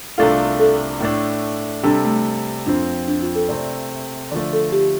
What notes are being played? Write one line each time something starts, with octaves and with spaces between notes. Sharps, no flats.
C2 C3 A3 D4 F4 A4
A4
A2 A3 D4
C3 G3 C4 D4 A4
A3
F2 F3 C4 D4
D4
F4
A4
C3 A3 C4 D5
D3 F3 A3 D5
A4
G4